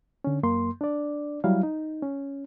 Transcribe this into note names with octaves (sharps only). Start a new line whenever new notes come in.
D3 C#4
F#2 A#3 C6
D4 D5
F#3 G3 E4 F5
D#4
C#4